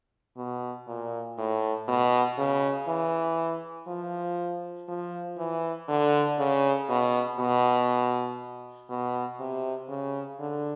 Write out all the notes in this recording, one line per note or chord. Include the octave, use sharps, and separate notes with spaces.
B2
A#2
A2
B2
C#3
E3
F3
F3
E3
D3
C#3
B2
B2
B2
C3
C#3
D3